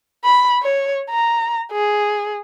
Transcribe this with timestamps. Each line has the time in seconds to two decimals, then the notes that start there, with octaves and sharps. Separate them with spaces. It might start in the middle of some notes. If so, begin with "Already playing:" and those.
0.24 B5
0.62 C#5
1.11 A#5
1.72 G#4